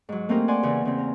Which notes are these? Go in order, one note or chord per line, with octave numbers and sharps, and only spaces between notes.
G#2 F#3
A3 A#3 C4 C#4 G4 A#4
D5 F#5 G#5 C6
E2 C#3 E3
C#3 C4
A#4